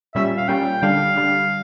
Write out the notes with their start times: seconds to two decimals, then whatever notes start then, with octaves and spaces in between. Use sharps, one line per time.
0.15 A#2 G3 C#4 E5
0.37 F5
0.48 A#2 G3 C#4 G5
0.82 D3 G3 D4 F5
1.16 D3 G3 D4